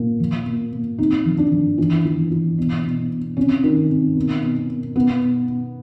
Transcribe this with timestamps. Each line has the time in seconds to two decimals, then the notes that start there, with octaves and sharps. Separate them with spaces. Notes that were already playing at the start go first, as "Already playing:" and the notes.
Already playing: A#2
0.20 F3
0.46 A#2
0.72 A#2
0.98 C3 D#4
1.26 F3
1.38 D4
1.51 F3
1.78 E3
2.05 E3
2.31 E3
2.58 B2
2.84 B2
3.10 B2
3.37 C3 C#4
3.64 D#3
3.90 C3
4.17 B2
4.43 B2
4.69 B2
4.96 B2 B3
5.22 B2
5.48 B2